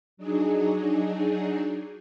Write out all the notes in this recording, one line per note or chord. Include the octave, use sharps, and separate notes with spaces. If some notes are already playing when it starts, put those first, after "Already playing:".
F#3 D4 D#4 G#4